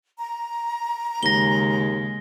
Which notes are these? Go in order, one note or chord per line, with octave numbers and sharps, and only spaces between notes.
A#5
D#2 C#3 G#3 A#6 G7